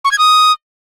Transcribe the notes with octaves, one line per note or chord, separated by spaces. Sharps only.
C#6
G#6
D#6